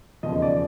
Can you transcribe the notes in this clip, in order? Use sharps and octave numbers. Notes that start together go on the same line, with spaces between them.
E1 D#2 C#3 F3 D#5
D5